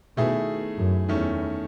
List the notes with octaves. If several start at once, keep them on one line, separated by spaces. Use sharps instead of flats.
B2 D#3 A3 E4 G#4
F#2
E2 D#3 A3 C#4